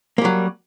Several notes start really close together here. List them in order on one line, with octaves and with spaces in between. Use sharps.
A#3 G3 F#3